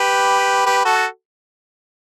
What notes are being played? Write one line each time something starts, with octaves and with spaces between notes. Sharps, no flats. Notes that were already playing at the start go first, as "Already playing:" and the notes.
Already playing: G4 B4
G4 B4
F#4 A4